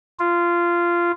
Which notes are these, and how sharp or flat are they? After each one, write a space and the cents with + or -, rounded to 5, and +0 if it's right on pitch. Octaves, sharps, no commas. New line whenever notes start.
F4 -15